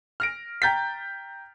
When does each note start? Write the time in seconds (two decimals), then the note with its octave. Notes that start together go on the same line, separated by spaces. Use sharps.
0.20 F6 A#6 D7
0.62 G5 A#5 G6 A6 B6